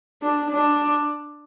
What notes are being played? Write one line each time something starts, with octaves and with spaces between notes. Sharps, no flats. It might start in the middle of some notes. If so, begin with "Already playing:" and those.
D4
D4